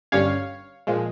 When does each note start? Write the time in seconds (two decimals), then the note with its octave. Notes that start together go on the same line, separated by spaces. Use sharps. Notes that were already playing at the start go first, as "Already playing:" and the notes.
0.12 G1 G2 G3 C#4 C#5 F5
0.87 A#2 F3 G#3